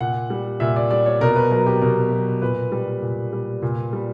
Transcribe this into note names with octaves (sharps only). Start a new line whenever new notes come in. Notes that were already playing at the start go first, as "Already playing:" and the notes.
A#2 F#5
G3
A#2 E5
D5
G3 D5
C#5
B2 A#4
B4
F#3 A#4
G4
B2 A#4
F#3
A#2 B4
G3
A#2
G3
A#2
G3